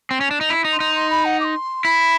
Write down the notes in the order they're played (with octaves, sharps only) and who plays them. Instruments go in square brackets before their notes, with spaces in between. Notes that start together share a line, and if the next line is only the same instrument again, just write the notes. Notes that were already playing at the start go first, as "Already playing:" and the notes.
[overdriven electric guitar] C4
C#4
D4
D#4
E4
D#4
[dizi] C6
[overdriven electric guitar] D#4
[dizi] C6
B5
F#5
D6
C6
[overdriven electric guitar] E4 [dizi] B5